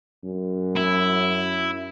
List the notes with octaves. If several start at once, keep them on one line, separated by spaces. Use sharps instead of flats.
F#2
E4